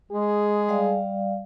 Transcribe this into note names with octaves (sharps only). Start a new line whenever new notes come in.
G#3 G#4
G3 D5 F5